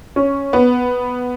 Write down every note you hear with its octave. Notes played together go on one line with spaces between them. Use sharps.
C#4
B3